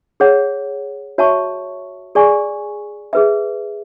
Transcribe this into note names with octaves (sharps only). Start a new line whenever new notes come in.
G#4 C#5 F#5
F#4 C#5 E5 A5 C#6
G#4 D5 G#5 C#6
G#4 B4 E5